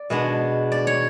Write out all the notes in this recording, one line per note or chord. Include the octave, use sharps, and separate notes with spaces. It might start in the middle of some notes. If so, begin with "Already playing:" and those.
Already playing: D5
B2 G#3 B3 D4
D5
C#5